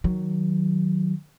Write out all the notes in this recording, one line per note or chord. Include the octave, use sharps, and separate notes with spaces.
D#3 F#3